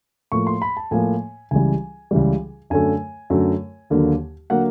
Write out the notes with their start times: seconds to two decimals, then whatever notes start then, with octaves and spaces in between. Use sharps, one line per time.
0.32 A2 F3 A#3 C#6
0.47 C6
0.62 B5
0.77 A5
0.91 A2 F3 A#3 G#5
1.51 C#2 C#3 E3 G3 G#5
2.11 C#2 C#3 E3 G3
2.70 F#2 D3 F#3 A3 G#5
3.30 F#2 D3 F#3 A3
3.90 D#2 D3 F#3 A#3
4.50 D3 F#3 A#3 F#5